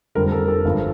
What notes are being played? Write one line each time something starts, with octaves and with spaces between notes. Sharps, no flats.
F1 F2 D3 G3 A#4
A4
A4
G1 G2 D3 F3